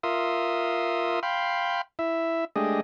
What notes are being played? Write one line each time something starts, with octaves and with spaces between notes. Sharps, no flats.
F4 A#4 E5 C6 D#6
F5 G5 B5 C6
E4 E5
G#3 A3 D4 G4 G#4 D#5